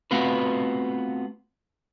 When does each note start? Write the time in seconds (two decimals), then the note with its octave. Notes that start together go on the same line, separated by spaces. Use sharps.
0.11 A3 B3 C4 F4 F#4 B4